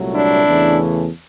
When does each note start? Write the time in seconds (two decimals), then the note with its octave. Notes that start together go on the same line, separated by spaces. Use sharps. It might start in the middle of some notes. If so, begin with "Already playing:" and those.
Already playing: C2 A#2 F#3 A3
0.13 D4 E4
0.45 E2 C#3 E3 A3